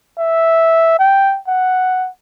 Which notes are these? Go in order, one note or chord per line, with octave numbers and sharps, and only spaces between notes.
E5
G5
F#5